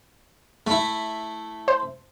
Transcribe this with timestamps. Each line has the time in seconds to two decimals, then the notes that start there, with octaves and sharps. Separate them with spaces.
0.67 A3 E4
1.68 C5